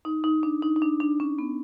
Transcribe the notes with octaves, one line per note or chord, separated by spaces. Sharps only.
D#4
D#4
D4
D#4
D#4
D4
D4
C#4
B3